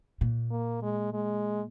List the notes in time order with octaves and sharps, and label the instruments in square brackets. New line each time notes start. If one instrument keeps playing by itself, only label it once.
[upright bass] A#2
[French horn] A#3
G#3
G#3